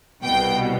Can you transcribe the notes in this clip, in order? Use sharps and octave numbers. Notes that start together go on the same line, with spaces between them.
C2 B2 G5